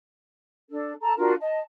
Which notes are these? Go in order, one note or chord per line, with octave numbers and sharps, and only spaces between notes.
D4 A4
A4 A5 A#5
D4 F4 F#4 A#4
D#5 A5